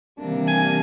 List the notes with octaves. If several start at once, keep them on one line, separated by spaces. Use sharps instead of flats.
C3 E3 G3 A#3 D4
G#5